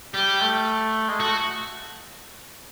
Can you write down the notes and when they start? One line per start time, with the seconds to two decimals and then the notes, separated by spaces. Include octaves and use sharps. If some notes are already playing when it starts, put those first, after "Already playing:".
0.14 G3 G4
0.40 A3
1.09 G#3
1.20 A3 F#4